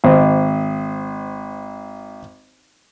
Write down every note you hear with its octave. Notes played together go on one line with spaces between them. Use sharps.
G#1 C5 D#5